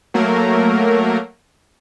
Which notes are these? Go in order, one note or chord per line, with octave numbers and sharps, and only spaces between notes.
F#3 A3 A#3 A#4